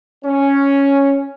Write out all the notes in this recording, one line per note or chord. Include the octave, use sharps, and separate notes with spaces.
C#4